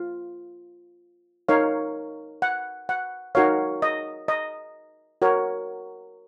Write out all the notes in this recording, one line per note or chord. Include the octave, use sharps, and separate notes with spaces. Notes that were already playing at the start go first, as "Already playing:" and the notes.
Already playing: F4
D#4 A#4 C#5 F5
F#5
F#5
D#4 F#4 A#4 C#5 F5
D#5
D#5
F#4 A#4 C#5